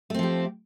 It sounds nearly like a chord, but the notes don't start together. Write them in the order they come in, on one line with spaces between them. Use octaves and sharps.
A3 C4 F3 G4